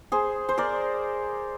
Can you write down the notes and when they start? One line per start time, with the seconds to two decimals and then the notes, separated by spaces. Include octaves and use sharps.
0.12 G#4 C5
0.49 C5
0.58 A#4 D5